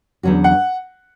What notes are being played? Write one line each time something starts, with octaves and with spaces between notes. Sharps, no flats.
E2 D3 F#3 C#4 F#4
F#5